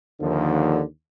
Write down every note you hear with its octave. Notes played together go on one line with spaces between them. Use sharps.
D#2 D3 F3